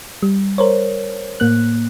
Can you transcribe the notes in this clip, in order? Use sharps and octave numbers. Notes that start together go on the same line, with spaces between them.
G3
A#4 C5 C#5
A2 A#3 F#6